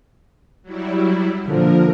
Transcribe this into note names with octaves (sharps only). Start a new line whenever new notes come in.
F#3 G3 E4
A#2 D3 F3 A#4